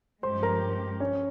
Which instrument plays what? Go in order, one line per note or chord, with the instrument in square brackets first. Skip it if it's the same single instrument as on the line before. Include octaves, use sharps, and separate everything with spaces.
[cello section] G2 F3 G#3 C#4 G4 [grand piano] C5 C6
[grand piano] A#4 A#5
C#4 C#5